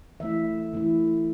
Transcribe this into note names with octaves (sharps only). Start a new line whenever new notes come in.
E3 A3 E4 E5
E3 A3 E4